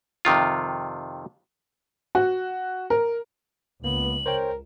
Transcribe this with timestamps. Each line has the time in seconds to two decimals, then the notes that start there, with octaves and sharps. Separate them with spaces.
0.25 F2 C3 D#3 F4
2.15 F#4
2.90 A#4
3.84 C#2 A#3 B3 F#7
4.26 A#4 C5 C#5 G5